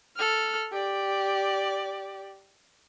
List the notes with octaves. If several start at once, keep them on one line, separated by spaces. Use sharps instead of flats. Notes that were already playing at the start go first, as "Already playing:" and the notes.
A4 F6
G4 D5